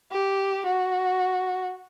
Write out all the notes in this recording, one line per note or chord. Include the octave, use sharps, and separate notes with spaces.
G4
F#4